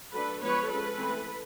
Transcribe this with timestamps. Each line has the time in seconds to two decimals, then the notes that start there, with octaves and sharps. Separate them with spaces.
0.13 F#3 A3 D4 A4 B4
0.41 F3 G#3 B3 B4 C#5
0.69 F3 G#3 C#4 A4 B4
0.98 E3 A3 C4